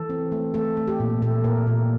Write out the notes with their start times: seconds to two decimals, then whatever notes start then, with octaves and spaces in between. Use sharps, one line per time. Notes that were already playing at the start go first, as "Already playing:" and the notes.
Already playing: E3 A4
0.09 C4
0.32 A3
0.54 A3 A4
0.77 A3
0.88 G4
1.00 A#2
1.22 A#2 A4
1.44 A#2 A#4
1.67 A#2